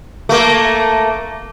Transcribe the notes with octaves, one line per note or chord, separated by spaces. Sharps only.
A3 A#3